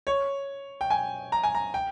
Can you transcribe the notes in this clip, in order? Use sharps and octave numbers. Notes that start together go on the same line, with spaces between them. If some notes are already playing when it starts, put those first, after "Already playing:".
C#5
G5
G#5
A#5
G#5
A#5
G5